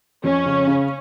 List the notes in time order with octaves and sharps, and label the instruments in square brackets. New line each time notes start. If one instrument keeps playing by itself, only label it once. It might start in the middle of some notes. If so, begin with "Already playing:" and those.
[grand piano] F2 [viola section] C#4
[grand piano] C#3
C#3